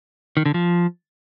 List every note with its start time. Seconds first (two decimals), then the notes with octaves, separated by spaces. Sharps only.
0.37 D#3
0.46 D3
0.54 F3